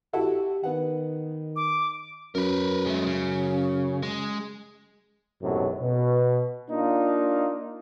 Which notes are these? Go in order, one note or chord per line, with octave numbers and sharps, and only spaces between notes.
E4 F#4 G4 A4
D#3 B3 F#5
D6
F#2 A#4 B4
G#3 A3
C#3
G#3
B1 F#2 A2 C3 F#3 G#3
B2
A#3 D4 D#4 F4